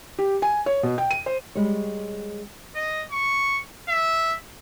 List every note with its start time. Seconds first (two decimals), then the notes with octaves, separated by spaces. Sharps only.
0.18 G4
0.42 G#5
0.66 C#5
0.83 B2
0.98 G5
1.11 D#7
1.26 C5
1.55 G3 G#3 C#5
2.76 D#5
3.11 C#6
3.89 E5